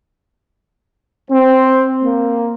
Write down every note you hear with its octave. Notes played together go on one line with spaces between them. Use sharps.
C4
A#3